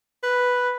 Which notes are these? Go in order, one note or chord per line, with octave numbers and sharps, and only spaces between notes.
B4